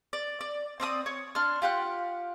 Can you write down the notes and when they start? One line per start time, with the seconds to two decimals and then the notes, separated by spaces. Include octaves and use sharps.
0.13 D5
0.41 D5
0.80 C4 D5 E5 D#6
1.06 C#5
1.35 D4 C6 F6
1.62 F4 G4 F#5 F#6